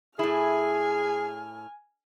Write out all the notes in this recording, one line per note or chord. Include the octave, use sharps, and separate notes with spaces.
A2 E4 G#4 G#5 F6